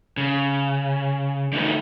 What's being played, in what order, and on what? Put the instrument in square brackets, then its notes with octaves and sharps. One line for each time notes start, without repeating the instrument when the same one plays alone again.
[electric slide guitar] C#3
D3 A3 D#4 B4